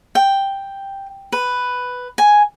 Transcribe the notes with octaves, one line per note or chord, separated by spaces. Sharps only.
G5
B4
G#5